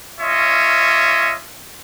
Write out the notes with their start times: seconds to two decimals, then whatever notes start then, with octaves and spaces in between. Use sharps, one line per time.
0.21 C#4 F4 C#5 D#5 E5